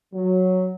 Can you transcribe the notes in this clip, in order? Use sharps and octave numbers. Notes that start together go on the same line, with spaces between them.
F#3